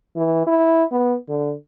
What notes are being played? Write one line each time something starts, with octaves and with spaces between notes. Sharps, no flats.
E3
E4
B3
D3